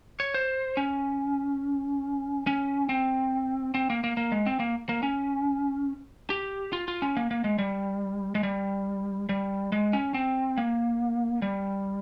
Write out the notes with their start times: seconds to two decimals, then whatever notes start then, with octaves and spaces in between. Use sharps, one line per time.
0.20 C#5
0.34 C5
0.77 C#4
2.47 C#4
2.89 C4
3.74 C4
3.90 A#3
4.04 A#3
4.17 A#3
4.32 G#3
4.46 C4
4.60 A#3
4.89 A#3
5.03 C#4
6.30 G4
6.73 F4
6.88 F4
7.02 C#4
7.17 A#3
7.31 A#3
7.44 G#3
7.58 G3
8.35 G#3
8.43 G3
9.29 G3
9.72 G#3
9.93 C#4
10.14 C4
10.58 A#3
11.42 G3